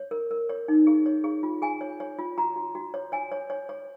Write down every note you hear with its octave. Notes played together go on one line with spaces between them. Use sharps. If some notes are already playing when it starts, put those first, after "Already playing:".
Already playing: C#5
A#4
A#4
C#5
D#4
G#4
C#5
G#4
F4
G#4 G#5
C#5
C#5
F4
F#4 A#5
F#4
F#4
C#5
C#5 G#5
C#5
C#5
C#5